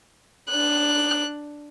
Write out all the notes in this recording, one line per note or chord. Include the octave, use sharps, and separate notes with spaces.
D4 F#6